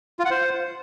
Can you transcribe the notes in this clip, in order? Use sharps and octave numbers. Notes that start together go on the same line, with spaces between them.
F4
F#5
C5